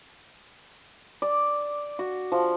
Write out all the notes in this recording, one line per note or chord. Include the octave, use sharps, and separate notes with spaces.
D5
F#4
F3